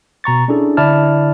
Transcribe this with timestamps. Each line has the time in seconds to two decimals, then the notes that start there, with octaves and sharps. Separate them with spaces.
0.24 B2 A#5 C#6 A6
0.48 C#4 D4 E4 G#4 A4
0.77 D3 E4 D5 A5 F6